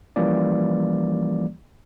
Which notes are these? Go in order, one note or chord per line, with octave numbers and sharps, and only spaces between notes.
E3 F3 G3 A#3 C#4 D5